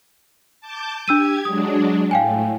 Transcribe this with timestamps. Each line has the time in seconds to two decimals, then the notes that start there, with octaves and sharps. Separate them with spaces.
0.61 A5 D6 G6
1.08 D4 G4 E6 G#6 D#7
1.45 F#3 G#3 D4 D#6
2.11 A2 F5 G5 G#5